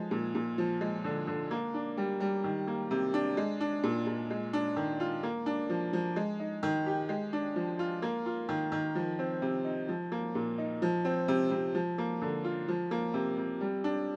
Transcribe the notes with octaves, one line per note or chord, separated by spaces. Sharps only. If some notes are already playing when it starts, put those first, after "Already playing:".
Already playing: F3 G#3
A#2
A#2
F3
G#3
D3
D3
A#3
D4
G3
G3
D#3
A#3
C3
D4
G#3
D4
A#2
A#2
G#3
D4
D#3
F4
A#3
D4
F3
F3
G#3
D#4
D#3
G4
G#3
D4
F3
F4
A#3
F4
D#3
D#3
F3
C4
C3
D#4
F3
A#3
A#2
D#4
F3
C4
C3
C3
F3
A#3
D3
F4
F3
A#3
C3
C3
G3
D4